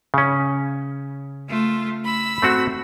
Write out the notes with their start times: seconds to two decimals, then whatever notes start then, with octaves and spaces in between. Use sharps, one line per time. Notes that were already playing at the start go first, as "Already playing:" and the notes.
0.14 C#3 C#4
1.49 A3 F4
2.04 B5 E6
2.42 A3 C4 F#4